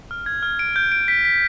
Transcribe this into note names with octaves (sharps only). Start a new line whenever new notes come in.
F6
G#6
F6
D7
G6
D7
B6
B6